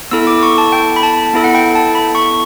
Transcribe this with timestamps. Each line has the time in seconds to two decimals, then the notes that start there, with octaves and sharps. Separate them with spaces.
0.11 B3 E4 A4 E6
0.27 D6
0.43 C#6
0.58 A5
0.72 G5
0.96 B5
1.03 A5
1.34 B3 E4 A4
1.44 F#5
1.55 G5
1.75 A5
1.95 B5
2.15 C#6